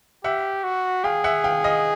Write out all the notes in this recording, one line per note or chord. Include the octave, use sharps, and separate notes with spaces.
G4 E5 F#5
F#4
G#4 F5 G5
E5 F#5
F5 G5
D#5 F5